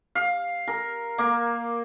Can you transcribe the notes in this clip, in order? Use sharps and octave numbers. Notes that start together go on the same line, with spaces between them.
F5
A#4
A#3